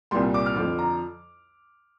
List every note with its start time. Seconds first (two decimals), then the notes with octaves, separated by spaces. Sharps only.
0.11 C2 A#2 G3 C6
0.34 D6
0.46 F6
0.56 F2 D3 F3 D6
0.79 A#5